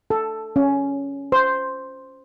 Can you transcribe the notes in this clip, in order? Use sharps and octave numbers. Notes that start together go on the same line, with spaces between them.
A4
C#4
C5